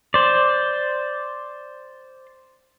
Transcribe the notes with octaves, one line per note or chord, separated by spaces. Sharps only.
C5 D5